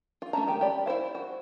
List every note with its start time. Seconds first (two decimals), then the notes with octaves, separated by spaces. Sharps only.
0.22 F4
0.33 A3 C#4 A5 A#5
0.47 D#3 G#3 G4
0.61 G4 D5 B5
0.86 E4 A#4 C5 F5
1.15 F#4